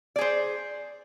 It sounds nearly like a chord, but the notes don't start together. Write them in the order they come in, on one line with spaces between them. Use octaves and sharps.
D5 G#4 C5